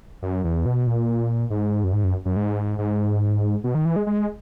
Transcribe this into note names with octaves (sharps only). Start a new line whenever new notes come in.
F#2
E2
B2
A#2
G#2
F#2
G#2
F#2
F#2
G#2
G#2
B2
D#3
E3
G#3
G#3